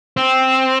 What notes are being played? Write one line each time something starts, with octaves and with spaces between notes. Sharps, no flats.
C4